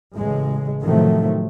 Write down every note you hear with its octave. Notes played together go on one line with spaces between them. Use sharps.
A1 C#3 G#3
A2 C3 D#3 F3 F#3 A3